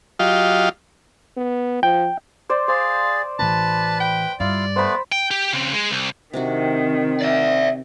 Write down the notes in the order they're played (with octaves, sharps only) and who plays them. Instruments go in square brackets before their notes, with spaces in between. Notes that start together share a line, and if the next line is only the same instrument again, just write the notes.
[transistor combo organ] F#3 F4 G4 D#5 F5
[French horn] B3
[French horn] F3 [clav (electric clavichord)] G5
[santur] C5 D5
[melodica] G#4 D5 [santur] C5 [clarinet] F5
[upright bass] A1 E3 [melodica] B4 B5 [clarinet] A5
[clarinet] G5
[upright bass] G2 [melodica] E4 F4 F5 [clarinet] D5
[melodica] A3 B3 B4 [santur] C5 B5
[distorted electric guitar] G5
G4
C#3 C4
G#3
C2
[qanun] C3 D4 F#4 [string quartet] D#3 [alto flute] C4
[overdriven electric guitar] D5 E5